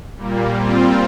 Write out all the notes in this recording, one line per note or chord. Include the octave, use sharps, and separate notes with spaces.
A#2 G3 A#3
A#2 G3 C4 F4